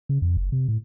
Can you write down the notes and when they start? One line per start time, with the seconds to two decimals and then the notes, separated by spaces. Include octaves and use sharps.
0.09 C#3
0.22 F2
0.37 F#1
0.52 C3
0.68 A2